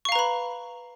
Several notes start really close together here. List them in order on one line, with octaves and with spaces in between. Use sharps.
C#6 F5 A#5 B4 B5